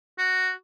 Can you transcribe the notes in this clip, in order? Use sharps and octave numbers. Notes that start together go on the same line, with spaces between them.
F#4